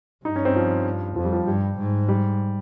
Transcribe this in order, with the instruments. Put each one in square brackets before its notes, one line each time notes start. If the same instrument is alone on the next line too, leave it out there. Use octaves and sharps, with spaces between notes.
[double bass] G2 [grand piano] D#4
[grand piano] C#4
C4
F3
[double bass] F2 [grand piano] F3
[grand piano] G3
F3
[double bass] G2 [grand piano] G3
[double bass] G#2
[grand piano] G3